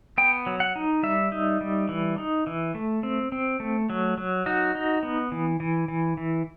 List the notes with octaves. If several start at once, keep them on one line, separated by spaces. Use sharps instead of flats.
B3 G5
F#3
F#5
D#4
G3 E5
D#4
G3
E3
D#4
E3
A3
C4
C4
A3
F#3
F#3
D#4 F#4
D#4
B3
E3
E3
E3
E3